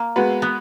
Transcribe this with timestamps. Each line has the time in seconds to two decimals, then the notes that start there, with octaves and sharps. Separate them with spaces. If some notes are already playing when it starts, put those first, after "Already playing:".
Already playing: A#3
0.16 G#3 B3 F#4 B4
0.42 B3